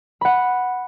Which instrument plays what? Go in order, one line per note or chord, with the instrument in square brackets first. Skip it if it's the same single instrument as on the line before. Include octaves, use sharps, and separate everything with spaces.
[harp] F#5 B5